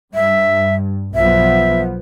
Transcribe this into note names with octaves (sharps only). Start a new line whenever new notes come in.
G2 E5
B1 F3 B3 E5